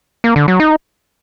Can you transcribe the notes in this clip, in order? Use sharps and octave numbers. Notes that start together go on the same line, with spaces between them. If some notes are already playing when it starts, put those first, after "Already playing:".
A#3
D3
F#3
D#4